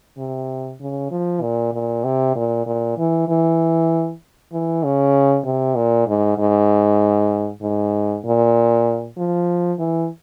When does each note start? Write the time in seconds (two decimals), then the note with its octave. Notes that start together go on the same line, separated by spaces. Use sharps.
0.18 C3
0.80 C#3
1.11 F3
1.41 A#2
1.73 A#2
2.04 C3
2.36 A#2
2.66 A#2
2.98 E3
3.28 E3
4.52 E3
4.84 C#3
5.45 C3
5.76 A#2
6.07 G#2
6.38 G#2
7.62 G#2
8.25 A#2
9.17 F3
9.79 E3